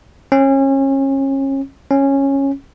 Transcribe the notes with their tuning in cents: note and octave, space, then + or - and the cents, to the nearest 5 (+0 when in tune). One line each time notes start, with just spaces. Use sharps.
C#4 -30
C#4 -10